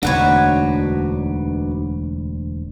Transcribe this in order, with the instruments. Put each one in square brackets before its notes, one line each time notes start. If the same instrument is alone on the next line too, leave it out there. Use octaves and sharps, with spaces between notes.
[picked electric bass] E1 D2 [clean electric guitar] D4 D#4 [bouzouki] F#4 B4 C#5